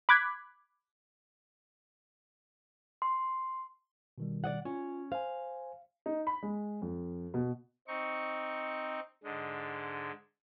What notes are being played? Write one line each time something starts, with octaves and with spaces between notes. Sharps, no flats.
B5 D6 F#6 G#6 B6
C6
B2 D#3 G3
D5 D#5 F#5
C#4 F4
C5 F5 G#5
D#4
B5
G#3
F2
B2
C4 D#4 C#6
G#2 D3 G#3